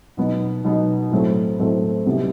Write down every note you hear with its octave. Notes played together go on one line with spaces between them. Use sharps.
B2 F#3 B3 D#4
B2 F#3 B3 D#4
A2 F#3 A3 C4
A2 F#3 A3 C4
C2 C3 D#3 F#3 B3